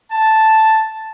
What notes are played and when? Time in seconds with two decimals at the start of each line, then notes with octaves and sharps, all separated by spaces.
0.12 A5